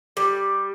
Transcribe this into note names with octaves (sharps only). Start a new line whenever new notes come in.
G3